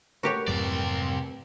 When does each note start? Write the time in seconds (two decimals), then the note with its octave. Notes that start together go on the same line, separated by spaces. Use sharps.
0.23 A3 F#4 G4 A#4 B4 C#5
0.48 F2 G#2 C3 F#3 D5